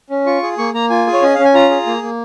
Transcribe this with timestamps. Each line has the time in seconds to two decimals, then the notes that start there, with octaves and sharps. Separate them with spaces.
0.10 C#4
0.26 F4 C#6
0.43 G#4
0.58 A#3 C#6
0.74 A#3 A#5
0.90 F4 G#5
1.07 G#4
1.13 C#5
1.22 C#4 D#5
1.34 C#4 F5
1.44 G#5
1.54 F4 A#5
1.70 G#4
1.86 A#3
2.03 A#3